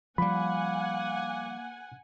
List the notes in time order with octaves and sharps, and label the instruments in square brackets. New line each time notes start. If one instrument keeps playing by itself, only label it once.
[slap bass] F3 G3 [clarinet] A#3 [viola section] F#5 G#5 [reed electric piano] B5